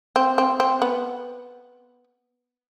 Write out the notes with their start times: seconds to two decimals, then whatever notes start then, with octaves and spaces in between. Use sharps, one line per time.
0.16 C4
0.38 C4
0.60 C4
0.82 B3